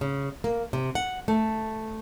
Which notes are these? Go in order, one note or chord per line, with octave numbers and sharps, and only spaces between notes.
C#3
A#3
C3
F#5
A3